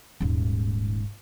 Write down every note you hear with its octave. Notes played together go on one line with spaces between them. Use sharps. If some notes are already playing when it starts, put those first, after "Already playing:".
D#1 G#2